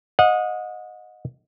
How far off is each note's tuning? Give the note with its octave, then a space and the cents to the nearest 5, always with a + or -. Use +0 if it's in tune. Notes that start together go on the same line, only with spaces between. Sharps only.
D#5 +0 F#5 -35